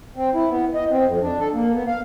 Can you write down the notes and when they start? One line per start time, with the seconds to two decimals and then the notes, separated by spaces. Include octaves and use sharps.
0.16 C4
0.35 E4
0.50 B3
0.74 D#5
0.90 C4
1.05 F2
1.22 D4
1.39 A4
1.54 A#3
1.74 B3
1.87 F5